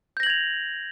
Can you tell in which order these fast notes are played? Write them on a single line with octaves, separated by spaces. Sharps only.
G6 A#6 F#7 G#6 F7